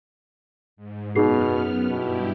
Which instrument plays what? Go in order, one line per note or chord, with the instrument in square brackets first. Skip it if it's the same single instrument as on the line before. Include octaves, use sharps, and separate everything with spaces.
[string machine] G#2
[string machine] F#2 B3 F6 [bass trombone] B2 [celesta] D#4 G#4 C7
[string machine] G2 E4 G4 [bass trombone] B2